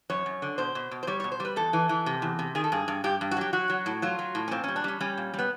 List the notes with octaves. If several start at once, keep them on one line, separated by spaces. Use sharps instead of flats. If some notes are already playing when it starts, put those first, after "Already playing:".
F#2 C#5
F#2
D3
B2 C5
B2
B2
C5
G3 C#5
B2 C#5
C5
G3 B4
E2 A4
E3
E3
C3
E2
C3
D#3 G#4
A4
G2 G#4
G2
G2 G4
G2
F#4
F#3 G4
F#3 F#4
F#3
A2
F#3 F4
F#3
A2
C#4
A#2 C4
G3 C#4
D4
G3 C#4
G3 C#4
A#2
G3
B3